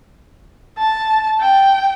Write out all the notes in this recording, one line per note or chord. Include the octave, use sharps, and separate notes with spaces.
A5
G5